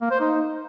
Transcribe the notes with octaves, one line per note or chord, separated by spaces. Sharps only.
A#3
C5
D#4